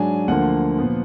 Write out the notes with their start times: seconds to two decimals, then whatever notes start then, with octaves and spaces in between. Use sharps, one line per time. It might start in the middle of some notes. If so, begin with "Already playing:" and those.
Already playing: G#2 F#3 D4 G#5
0.28 D2 D3 F3 A#3 F#5
0.78 A#2 F3 B3